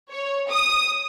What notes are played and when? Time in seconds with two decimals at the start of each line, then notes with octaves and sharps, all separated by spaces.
0.11 C#5
0.50 D#6